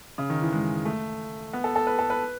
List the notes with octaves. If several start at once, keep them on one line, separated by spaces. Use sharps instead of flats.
C#3
D#3
E3
G#3
A3
B3
A4
A4
B4
A4
B4